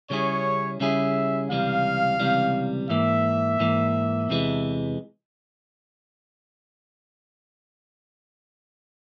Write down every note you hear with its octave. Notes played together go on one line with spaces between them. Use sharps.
C#3 G3 C#4 E4 G#4 C#5
C#3 G3 C#4 E4 G#4 E5
C#2 C3 E3 G3 F5
C#2 C3 E3 G3
G#2 E3 A#3 E5
G#2 E3 A#3
E2 C3 E3 G#3